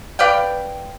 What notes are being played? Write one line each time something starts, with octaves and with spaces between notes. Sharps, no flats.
B4 D5 F5 G5